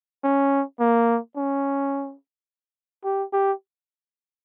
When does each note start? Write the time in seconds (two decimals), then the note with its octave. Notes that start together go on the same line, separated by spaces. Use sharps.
0.24 C#4
0.80 A#3
1.37 C#4
3.04 G4
3.33 G4